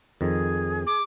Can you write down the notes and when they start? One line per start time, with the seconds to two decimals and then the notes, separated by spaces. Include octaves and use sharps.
0.21 F2 D#3 G#4
0.87 D6